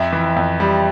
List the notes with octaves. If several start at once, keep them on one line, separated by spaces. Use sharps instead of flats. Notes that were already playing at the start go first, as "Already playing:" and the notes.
Already playing: F2 E5
E3
F2
G3